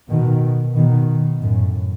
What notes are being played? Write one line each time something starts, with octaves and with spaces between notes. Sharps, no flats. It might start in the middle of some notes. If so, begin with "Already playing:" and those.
B2 D#3
B2 D#3
F#2 A2